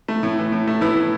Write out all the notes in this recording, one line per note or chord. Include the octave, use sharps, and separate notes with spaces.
A3
A2
E3
A2
A3
A2 B3 E4
E3